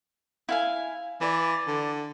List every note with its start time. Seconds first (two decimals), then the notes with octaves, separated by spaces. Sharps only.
0.49 E4 F5 G#5
1.21 E3 D5
1.67 D3